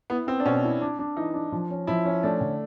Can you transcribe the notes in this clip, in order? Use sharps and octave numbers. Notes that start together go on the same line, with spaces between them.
B3 E4
B3 C4
D4
B2 C#4
E4
D4
D4
E3 D#4
D4
F3
C#4
F3 E4
C#4
A3 D4
D3